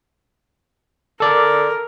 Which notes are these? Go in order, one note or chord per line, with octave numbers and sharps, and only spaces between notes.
A4 A#4 D5